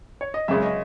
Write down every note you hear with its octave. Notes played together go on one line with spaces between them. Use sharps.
C#5
D#5
F#2 C#3 G#3 E5
D#5